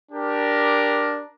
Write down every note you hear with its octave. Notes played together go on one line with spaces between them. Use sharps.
D4 G4 A#4